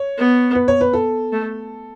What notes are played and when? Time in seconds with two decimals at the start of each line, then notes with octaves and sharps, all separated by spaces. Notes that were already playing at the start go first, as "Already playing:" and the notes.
Already playing: C#5
0.18 B3
0.55 B4
0.68 C#5
0.81 B4
0.93 A4
1.32 A3